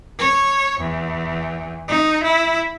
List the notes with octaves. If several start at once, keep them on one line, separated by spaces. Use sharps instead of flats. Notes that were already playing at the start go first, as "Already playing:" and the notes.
C#5
E2
D#4
E4